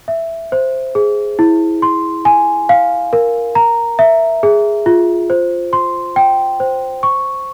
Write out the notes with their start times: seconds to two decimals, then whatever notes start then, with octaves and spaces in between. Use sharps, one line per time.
0.08 E5
0.52 C5
0.95 G#4
1.39 E4
1.82 C6
2.25 G#5
2.69 F5
3.13 A#4
3.55 A#5
3.99 E5
4.43 G#4
4.86 F4
5.30 C5
5.73 C6
6.16 G5
6.60 C5
7.03 C#6